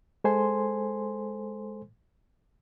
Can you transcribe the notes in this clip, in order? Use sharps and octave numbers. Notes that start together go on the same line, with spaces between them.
G#3 A4 C5 G#5 C6